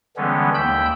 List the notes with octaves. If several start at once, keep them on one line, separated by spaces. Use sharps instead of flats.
D3 E3 G3 G#3 B3 C#4
D#2 G5 B5 E6 G6